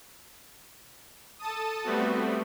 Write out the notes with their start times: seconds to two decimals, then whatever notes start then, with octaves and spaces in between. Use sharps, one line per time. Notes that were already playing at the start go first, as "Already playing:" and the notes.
1.39 A4 A5 D#6
1.83 G3 A3 B3 C4 F#4